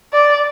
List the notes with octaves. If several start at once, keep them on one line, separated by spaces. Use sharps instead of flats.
D5